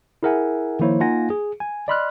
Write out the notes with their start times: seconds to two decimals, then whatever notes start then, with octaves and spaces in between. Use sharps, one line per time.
0.23 E4 G#4 A#4 E5 F#5 G#5
0.80 D#3 F3 A#3 E4 C5 C#5
1.00 A#3 D#4 F4 F#5 G#5 A#6
1.30 G#4
1.60 G#5
1.88 D5 D#5 B5 C6 F6 F#6